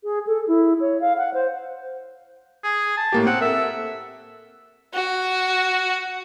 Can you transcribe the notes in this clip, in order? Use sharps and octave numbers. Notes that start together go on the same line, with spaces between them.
G#4
A4
E4
C#5
F5
F#5
C5
G#4
A5
A2 A#3 G4
C4 F#5
A4 A#4 E5
F#4